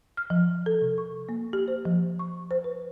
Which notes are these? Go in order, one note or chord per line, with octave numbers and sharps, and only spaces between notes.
F6
F3
A4
C3
C#6
A#3
G4
C5
F3
C#6
C5
B4